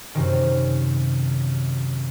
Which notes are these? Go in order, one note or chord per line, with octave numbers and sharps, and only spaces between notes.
F#2 C3 D#3